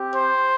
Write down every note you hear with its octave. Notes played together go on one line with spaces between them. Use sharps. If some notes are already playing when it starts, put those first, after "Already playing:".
Already playing: C4 G4
C5